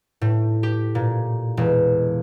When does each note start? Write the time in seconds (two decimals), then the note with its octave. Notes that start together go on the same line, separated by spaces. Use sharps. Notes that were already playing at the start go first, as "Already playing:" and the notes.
0.21 A2
0.63 G4
0.95 A#2
1.57 E1